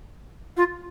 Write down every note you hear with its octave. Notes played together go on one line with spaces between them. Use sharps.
F4